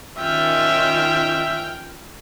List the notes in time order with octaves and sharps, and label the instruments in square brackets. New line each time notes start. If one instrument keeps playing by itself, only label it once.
[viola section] D#3 C#4 F4 [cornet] E5 [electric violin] G5 F6